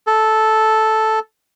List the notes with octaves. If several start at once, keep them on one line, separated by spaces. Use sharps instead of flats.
A4